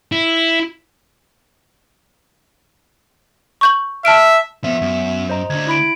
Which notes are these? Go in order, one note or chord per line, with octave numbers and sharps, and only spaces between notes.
E4
C#6 G6 F#7
E5 A5 F6 D7
F3 B3 C4 E5
F#2
C5 D#5 A#5
D2 D3 G#6
E4 B5 D7